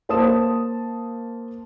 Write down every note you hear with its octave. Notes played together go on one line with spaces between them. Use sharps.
A#3 C5 A5 D#6 E7